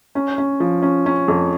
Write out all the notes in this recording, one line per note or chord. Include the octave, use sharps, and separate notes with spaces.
C#4
C#4
F3
C#4
C#4
F2